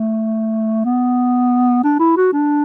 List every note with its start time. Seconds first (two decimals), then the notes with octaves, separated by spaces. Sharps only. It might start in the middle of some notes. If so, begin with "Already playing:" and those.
Already playing: A3
0.85 B3
1.84 D4
1.99 E4
2.17 F#4
2.33 D4